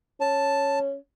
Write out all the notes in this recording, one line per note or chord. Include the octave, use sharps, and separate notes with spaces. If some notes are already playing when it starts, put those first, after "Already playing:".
C#4 A5